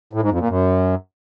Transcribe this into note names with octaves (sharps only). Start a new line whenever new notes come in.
A2
G#2
F2
A#2
F#2